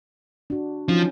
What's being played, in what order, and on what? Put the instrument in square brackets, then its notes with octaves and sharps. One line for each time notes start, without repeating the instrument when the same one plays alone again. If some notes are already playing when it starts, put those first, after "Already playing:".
[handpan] D4 F#4
[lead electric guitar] F3 [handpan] C#4 D#4 F#4